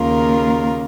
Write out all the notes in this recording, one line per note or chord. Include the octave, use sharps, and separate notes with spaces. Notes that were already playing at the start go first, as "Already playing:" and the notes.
Already playing: D#2 C#3 A#3 F4 A#4